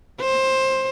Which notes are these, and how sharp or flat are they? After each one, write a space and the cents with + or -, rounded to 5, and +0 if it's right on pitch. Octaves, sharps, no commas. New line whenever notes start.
C5 +15